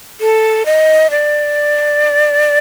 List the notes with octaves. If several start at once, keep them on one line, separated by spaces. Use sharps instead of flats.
A4
D#5
D5